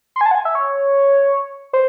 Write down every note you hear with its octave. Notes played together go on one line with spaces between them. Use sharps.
C6
G#5
A5
F#5
G#5
E5
C#5
C5